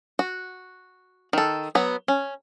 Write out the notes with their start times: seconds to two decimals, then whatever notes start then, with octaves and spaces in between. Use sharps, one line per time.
0.19 F#4
1.33 D#3 A4
1.75 F#3 B3
2.08 C#4